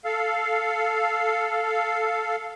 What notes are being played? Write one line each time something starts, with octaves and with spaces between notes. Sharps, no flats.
A4 F5